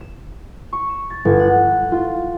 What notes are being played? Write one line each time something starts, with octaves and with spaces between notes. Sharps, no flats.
E7
C#6
E7
A6
G1
F#5
F4